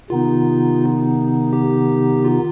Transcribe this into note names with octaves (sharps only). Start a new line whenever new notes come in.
C3 D#3 B3 D#4 F4
G4
F4